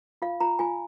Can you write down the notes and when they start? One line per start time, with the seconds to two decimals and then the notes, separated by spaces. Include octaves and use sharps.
0.22 F4 F5
0.40 F4 A#5
0.59 F4 G#5